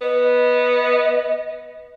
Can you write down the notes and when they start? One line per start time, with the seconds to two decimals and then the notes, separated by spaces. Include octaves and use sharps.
0.01 B3 D#5